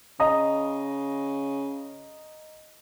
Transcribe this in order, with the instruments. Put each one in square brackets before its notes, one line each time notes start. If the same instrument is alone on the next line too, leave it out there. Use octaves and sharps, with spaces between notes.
[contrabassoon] C#3 [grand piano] D#5 A#5 D#6